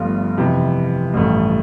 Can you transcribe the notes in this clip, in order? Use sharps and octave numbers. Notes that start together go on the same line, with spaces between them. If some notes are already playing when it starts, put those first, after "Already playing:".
Already playing: G1 G2 F3 A3 F4
F2 C3 E3
A1 G2 F3 A3